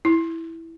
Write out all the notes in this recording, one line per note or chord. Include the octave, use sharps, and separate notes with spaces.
E4